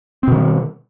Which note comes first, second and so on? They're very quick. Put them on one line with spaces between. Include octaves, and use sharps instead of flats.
C4 B2 D#3 G3